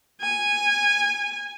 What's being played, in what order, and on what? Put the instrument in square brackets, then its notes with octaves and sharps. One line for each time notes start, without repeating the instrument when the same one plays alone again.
[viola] G#5